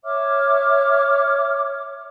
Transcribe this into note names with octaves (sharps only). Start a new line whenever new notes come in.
C#5 E5 D6 F6